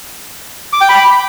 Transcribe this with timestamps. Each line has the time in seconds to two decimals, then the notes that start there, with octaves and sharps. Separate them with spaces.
0.73 D6
0.81 G5
0.89 B5